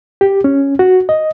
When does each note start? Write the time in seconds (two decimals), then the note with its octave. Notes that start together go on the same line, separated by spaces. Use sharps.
0.21 G4
0.44 C#4
0.79 F#4
1.09 D#5